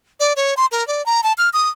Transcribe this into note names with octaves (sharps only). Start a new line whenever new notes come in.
D5
C#5
C6
A#4
D5
A#5
A5
F6
D#6